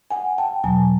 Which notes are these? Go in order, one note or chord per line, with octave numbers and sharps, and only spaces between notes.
F#5 G#5
G5 A5
E2 B2 F#3 G#5 A#5